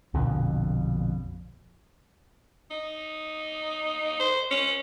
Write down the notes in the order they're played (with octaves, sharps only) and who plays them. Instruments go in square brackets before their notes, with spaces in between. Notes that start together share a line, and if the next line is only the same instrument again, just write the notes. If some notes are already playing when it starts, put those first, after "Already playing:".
[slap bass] A#1 F2 B2 D3
[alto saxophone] D#4
C5
C#4